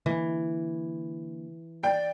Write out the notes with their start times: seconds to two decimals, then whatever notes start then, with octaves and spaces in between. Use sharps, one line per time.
0.06 D3 E3 A#3
1.83 D5 G5